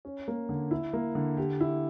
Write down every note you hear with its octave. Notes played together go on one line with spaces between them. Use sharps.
C#4
A#3
D3
E4
A#3
D3
G4
E4